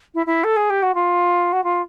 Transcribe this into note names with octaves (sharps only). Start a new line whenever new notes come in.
E4
E4
A4
G#4
G4
F#4
F4
F#4
F4